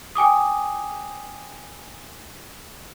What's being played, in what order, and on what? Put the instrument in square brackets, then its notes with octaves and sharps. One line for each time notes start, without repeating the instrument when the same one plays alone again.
[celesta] G5 G#5 D6 D#6